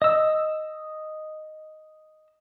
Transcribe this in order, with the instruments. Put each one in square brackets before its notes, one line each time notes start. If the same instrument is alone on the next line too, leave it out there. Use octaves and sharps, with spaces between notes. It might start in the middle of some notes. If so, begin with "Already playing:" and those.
[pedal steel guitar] D#5 E6